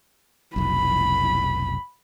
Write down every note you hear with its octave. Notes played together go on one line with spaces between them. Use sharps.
F1 B1 B5